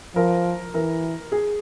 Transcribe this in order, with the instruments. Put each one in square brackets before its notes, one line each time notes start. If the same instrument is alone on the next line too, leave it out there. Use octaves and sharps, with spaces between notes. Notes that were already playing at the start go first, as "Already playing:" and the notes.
[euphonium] F3 [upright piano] A#4
[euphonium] E3 [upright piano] A#4
[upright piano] G#4